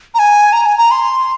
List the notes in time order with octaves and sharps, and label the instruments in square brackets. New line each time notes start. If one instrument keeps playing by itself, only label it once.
[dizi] A#5
G#5
A#5
G#5
A#5
C6